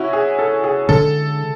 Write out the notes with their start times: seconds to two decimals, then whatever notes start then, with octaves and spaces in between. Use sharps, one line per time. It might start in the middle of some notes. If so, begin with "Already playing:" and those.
Already playing: C#4 E4 F#4
0.13 G#4
0.39 A4
0.64 G#4
0.89 D3 G#3 D4 A4